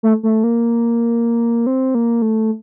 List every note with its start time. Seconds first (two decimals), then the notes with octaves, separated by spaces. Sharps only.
0.03 A3
0.23 A3
0.44 A#3
1.67 C4
1.95 A#3
2.22 A3